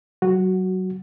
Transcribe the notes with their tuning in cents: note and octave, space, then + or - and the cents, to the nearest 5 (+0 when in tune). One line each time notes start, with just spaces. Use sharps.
F#3 +20 F#4 +0